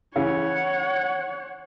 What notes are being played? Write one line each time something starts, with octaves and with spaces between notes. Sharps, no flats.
C#3 E3 C#5 F#5